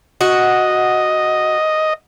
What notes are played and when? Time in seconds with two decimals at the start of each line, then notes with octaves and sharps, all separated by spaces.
0.21 F#4 D#5